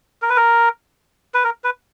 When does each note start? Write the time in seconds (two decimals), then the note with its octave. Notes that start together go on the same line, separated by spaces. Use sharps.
0.22 A#4
0.30 B4
0.37 A#4
1.34 B4
1.44 A#4
1.64 B4